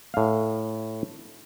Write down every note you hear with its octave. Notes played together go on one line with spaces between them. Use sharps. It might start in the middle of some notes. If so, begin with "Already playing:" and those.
A2 F5